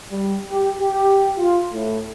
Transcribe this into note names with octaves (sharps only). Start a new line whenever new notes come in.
G3
G4
G4
F4
A2